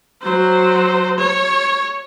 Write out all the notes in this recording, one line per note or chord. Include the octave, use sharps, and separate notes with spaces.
F#3 C5
C#5